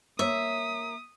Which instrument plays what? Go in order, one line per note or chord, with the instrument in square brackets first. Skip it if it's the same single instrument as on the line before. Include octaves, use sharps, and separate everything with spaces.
[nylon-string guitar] A#3 C#5 [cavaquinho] E5 [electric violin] D#6